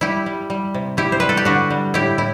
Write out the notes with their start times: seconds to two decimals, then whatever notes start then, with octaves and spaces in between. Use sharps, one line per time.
0.01 G3 E4 G4
0.26 G3
0.50 G3
0.74 C3
0.97 G3 E4 G4
1.12 C5
1.20 G3 B4
1.29 A4
1.37 G4
1.45 D3 D4 F#4
1.70 G3
1.94 A2 E4 G4
2.18 A2 E4